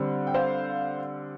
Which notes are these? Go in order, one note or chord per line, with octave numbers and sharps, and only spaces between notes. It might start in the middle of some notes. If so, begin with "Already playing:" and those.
Already playing: D3 G3 C4
G5
C5 F5